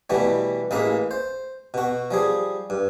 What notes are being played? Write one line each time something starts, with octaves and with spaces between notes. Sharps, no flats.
B2 E3 G3 A3
A1 E3 G#3 A#3 E5
C5
B2 F#4
F3 G3 G#4
G2